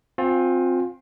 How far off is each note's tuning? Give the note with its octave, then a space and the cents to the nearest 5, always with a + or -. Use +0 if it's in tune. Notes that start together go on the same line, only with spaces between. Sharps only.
C4 +0 F4 +30 G#5 +0